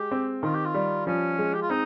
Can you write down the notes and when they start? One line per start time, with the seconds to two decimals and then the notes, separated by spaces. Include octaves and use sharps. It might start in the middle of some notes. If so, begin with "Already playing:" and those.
Already playing: G#3 G4
0.11 C4
0.43 D#3 F4
0.55 G4
0.66 F4
0.74 G3
1.07 F3 C#4
1.39 G#3
1.54 G4
1.62 F4
1.70 C4 D#4